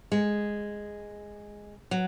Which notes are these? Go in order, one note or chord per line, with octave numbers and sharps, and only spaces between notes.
G#3
F#3